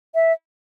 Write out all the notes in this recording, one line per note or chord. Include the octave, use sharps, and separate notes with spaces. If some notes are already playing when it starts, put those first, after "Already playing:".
E5